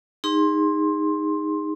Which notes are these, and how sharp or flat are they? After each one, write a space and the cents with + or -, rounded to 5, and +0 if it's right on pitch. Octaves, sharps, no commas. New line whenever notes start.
D#4 +0 G#4 -30 C6 +10